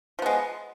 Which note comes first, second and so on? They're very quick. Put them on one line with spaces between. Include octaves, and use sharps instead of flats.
F3 B3 G#3